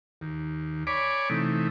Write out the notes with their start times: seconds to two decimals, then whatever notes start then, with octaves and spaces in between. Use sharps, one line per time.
0.21 D#2
0.87 C#5 D5 G#5 B5 D6
1.30 C3 E3 A3 D#4